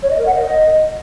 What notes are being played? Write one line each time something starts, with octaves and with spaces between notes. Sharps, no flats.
C#5
D#5
A#4
F#5
D#5